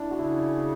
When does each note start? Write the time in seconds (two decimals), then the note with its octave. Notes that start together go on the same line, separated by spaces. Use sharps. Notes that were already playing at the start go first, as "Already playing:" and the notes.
Already playing: D4 E4
0.11 F#4
0.19 C#3 E4